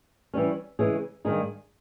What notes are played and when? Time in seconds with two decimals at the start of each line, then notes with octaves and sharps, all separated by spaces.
0.34 E3 G3 C#4
0.79 C#3 E3 G#3 C#4 G#4
1.25 G2 D#3 G#3 D#4 G#4